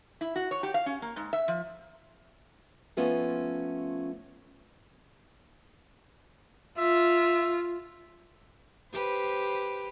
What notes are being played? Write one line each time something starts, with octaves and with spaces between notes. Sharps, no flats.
E4
F#4
C#5
G4
F5
C#4
A#3
G#2
E5
F3
F3 A3 B3 C#4 F4
F4 E5
G4 B4 C5